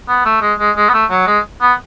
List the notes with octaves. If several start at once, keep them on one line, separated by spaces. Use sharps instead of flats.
B3
A3
G#3
G#3
G#3
B3
A3
F#3
G#3
B3